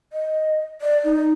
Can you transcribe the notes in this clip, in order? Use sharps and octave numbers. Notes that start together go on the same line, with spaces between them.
D#5
D5
D#4